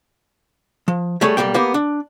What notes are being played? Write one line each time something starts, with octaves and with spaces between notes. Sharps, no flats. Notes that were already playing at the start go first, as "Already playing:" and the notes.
F3
G3 A3 G#4 C#5
B1 F3 G3 A#3 G5
A#3 B3 G4
D4